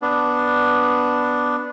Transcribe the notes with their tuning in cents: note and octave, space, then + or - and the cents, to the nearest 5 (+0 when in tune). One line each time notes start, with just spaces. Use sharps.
B3 +0 D4 +0